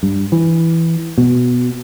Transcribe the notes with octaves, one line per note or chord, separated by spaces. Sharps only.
G2
E3
B2